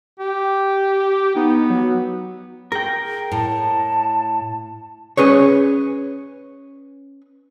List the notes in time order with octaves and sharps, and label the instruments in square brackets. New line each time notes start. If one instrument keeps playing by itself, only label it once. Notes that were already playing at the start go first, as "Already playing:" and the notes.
[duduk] G4
[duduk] B3 [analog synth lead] D#4
[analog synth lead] F#3
[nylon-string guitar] G#4 [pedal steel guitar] A#4 G5
[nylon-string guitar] A2 [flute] A5
[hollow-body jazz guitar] C#4 G#4 B4 C#5